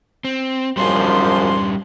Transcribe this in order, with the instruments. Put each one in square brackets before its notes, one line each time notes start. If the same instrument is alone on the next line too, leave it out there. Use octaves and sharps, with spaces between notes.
[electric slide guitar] C4
[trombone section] G#1 F#2 F3 [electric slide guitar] G3 C#4 D4 [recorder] C6